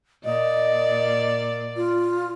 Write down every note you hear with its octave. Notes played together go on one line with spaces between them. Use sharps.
A#2 D5 D#5
F4